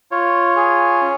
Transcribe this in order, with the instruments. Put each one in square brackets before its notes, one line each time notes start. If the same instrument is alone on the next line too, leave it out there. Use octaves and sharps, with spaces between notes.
[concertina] F4 C#5
G#4
C#4